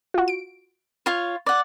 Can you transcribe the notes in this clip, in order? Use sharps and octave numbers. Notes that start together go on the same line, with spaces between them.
F4 F#4
D7
F4 C#5
D5 F#5